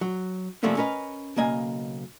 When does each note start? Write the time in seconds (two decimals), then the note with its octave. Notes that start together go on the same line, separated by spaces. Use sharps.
0.01 F#3
0.63 C3 F3 G3 A3 A#3 C#4
0.77 C#4 A#4 B4 D#5
1.36 B1 C#3 A#3 D#5 G#5